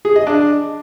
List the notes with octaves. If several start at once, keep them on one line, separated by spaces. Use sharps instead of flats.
G#4
D#5
D4